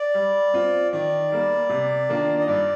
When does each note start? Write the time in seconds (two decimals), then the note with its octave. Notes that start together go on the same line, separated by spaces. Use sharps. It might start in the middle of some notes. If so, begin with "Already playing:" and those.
Already playing: D5
0.14 G3
0.54 C4 F4
0.92 D#3 D5
1.32 G3 A#3
1.69 C3
2.09 D#3 A#3 D4 F4
2.40 D#5
2.48 G2 D5